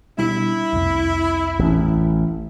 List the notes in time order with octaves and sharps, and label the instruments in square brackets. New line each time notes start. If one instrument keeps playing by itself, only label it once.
[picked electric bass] B2 G3 D4 [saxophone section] E4
[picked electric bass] C2 F2
[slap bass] A1